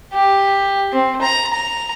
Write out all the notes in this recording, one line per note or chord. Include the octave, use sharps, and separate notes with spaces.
G4
C4
A#5
A#5